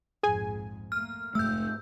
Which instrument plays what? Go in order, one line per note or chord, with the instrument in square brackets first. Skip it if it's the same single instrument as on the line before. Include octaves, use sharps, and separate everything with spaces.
[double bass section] A#1 F2 G#2 [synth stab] G#4 G#5
[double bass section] A3 A#3 [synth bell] F6
[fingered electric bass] F1 A3 [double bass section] G#2 [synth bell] E6 G6